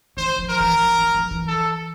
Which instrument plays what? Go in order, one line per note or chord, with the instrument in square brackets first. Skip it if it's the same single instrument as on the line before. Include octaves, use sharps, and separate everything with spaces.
[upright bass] E3 [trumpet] C5
[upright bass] F3
[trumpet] A#4
[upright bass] E3
F3
E3
F3
E3
[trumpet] A4